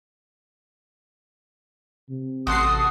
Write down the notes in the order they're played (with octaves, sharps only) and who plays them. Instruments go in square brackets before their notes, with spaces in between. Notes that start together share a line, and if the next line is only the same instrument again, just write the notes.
[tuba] C3
[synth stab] A1 C6 C7 [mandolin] F#4 A4 F#5 [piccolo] D#6